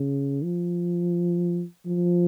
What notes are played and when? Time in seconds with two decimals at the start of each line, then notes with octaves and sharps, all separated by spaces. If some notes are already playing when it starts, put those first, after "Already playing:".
Already playing: C#3
0.43 F3
1.86 F3